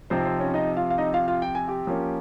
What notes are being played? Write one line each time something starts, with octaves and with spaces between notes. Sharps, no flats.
C3 F3 C4 D#4 C5
C5
C#4 C#5
D#4 D#5
F4 F5
F5
D#4 D#5
F4 F5
F4 F5
G5
G#5
G4 G5
F3 A#3 C#4